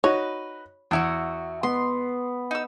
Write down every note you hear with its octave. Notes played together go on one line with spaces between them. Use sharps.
D#4 F#4 B4 C#5
E2 D4 E4 F#4
B3 C6
D#4 E6